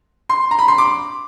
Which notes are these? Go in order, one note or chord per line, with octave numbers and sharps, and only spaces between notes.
C6
A#5
B5
C6
D6